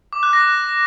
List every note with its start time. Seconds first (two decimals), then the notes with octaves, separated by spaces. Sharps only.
0.13 D6
0.23 F#6
0.33 A#6